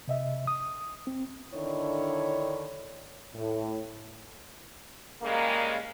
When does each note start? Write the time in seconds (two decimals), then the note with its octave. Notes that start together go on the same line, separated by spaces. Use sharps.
0.08 C3 D#5 E5
0.47 D#6
1.07 C4
1.54 D3 D#3 D4 E4 C#5
3.35 A2
5.21 C#3 G3 G#3 A#3